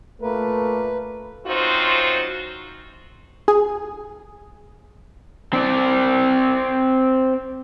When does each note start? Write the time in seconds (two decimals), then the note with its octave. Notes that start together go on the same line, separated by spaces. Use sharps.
0.22 A#2 A3 A#3 A#4 B4
1.46 F#2 C4 D#4 F4 F#4 C5
3.48 G#4
5.53 C4 D5